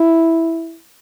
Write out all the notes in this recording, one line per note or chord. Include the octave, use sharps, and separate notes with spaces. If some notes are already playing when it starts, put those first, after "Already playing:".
Already playing: E4